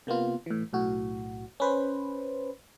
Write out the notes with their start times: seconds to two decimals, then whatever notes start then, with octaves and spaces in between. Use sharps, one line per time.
0.07 C3 A#3 B3 F4
0.46 A2 E3
0.73 B1 A2 F#4
1.60 C#4 B4 C5